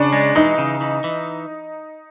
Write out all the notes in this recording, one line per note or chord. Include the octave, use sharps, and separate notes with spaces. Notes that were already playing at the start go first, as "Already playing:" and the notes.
Already playing: C#3 D4
G#3
E3 D#4
C#3
E3
E3